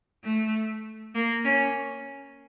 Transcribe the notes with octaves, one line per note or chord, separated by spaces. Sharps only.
A3
A#3
C#4